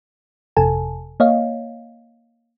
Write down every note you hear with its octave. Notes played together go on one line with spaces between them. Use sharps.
G1 F2 C3 A4 G#5 A5
A#3 C#5 D#5 F5